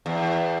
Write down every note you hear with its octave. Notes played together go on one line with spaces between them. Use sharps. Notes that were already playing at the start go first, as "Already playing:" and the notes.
E2